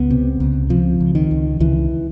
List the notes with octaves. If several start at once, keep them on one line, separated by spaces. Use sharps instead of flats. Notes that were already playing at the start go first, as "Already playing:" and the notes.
Already playing: C#2 B3
C3
C#2
C3 F3
C#2
D#3
C#2
C#2 E3